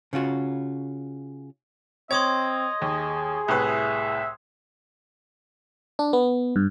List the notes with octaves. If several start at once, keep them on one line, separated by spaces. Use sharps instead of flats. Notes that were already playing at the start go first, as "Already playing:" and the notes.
C#3 C#4 F4 F#4
C4 C#5 D#5 C6 D#6 G#6
D#2 G#4
C2 A2 B4 E5
D4
B3
G2